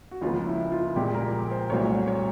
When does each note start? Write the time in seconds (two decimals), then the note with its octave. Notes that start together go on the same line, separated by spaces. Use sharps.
0.11 F#4
0.21 C#2 C#3 F3 A#3 F4
0.47 E4
0.72 F4
0.96 A#1 A#2 F3 G#3 G4
1.15 A#4
1.51 C5
1.70 C2 A#2 F#3 A3 C#5
2.08 C#5